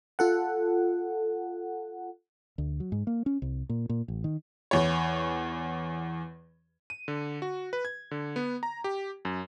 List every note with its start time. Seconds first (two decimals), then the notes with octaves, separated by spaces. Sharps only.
0.19 F4 A4 F#5
2.58 D2
2.80 F#3
2.92 G#2
3.07 A#3
3.26 C#4
3.42 C2
3.69 A#2
3.89 A#2
4.08 A1
4.24 D#3
4.71 E2 C#5
6.90 D#7
7.08 D3
7.42 F#4
7.73 B4
7.85 G#6
8.11 D3
8.36 B3
8.63 A#5
8.84 G4
9.25 F#2